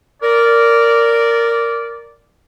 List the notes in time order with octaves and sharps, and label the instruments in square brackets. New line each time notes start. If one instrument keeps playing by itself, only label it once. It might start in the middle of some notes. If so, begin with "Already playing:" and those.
[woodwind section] A#4 D5